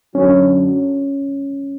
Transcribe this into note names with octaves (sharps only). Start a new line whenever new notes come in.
F#2 D3 F#3 C#4